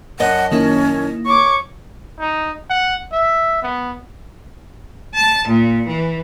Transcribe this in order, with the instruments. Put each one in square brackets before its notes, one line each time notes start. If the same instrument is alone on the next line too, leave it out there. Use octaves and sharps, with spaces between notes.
[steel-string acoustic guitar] F#2 D#5 A5 [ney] F#5
[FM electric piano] D#3 A#3 E4 [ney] C#4
[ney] C#5 [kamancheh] C#6 D6
[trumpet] D#4
F#5
E5
B3
[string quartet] A5
A#2
E3